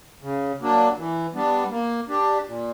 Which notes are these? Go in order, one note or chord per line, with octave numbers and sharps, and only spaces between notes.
C#3
F#3 A#3 D4
E3
G3 B3 D4
A#3
D4 G4
A#2